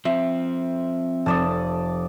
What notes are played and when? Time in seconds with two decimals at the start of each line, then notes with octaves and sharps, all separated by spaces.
0.05 F3 C4 E5
1.26 F1 A4 D5 D#6 E7